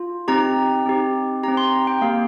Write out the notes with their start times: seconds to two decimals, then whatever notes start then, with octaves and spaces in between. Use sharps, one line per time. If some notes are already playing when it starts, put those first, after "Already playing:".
Already playing: F4
0.28 C4 D#4 G4 A#5
0.86 C4 D#4 G4
1.43 C4 D#4 G4 A#5
1.57 C6
1.72 A#5
1.87 G5
2.02 A#3 G4 F5